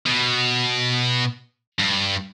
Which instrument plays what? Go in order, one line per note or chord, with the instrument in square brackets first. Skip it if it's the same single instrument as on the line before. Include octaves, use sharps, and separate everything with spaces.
[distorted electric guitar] B2
G2